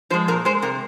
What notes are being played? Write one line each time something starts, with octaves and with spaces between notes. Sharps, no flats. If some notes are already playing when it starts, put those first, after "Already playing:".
F3 G#3 C5
A#2 A#4
G#3 C5
C3 A#4